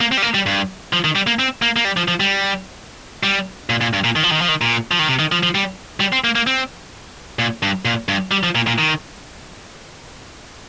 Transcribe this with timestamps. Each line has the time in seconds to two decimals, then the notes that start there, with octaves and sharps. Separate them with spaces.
0.01 A#3
0.12 C4
0.17 G3
0.22 A#3
0.34 G3
0.46 G2
0.93 F3
1.04 D#3
1.15 G3
1.27 A#3
1.39 C4
1.62 A#3
1.76 A#3
1.85 G3
1.97 F3
2.08 F3
2.20 G3
3.23 G3
3.70 A#2
3.81 A#2
3.93 G2
4.04 A#2
4.16 D#3
4.23 F3
4.32 D#3
4.41 F3
4.48 D#3
4.61 A#2
4.91 F3
4.99 D#3
5.08 C3
5.19 D#3
5.32 F3
5.43 F3
5.55 G3
6.00 G3
6.12 C4
6.24 A#3
6.35 A#3
6.47 C4
7.39 A#2
7.63 G2
7.85 A#2
8.08 G2
8.31 G3
8.43 F3
8.55 A#2
8.67 A#2
8.78 D#3